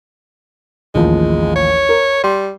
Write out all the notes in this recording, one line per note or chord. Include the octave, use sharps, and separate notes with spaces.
A1 D#2 F3 G#3
C#5
A#4
G3 C6